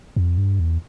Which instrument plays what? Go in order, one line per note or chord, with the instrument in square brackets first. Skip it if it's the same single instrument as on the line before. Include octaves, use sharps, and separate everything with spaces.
[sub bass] F2
G2
E2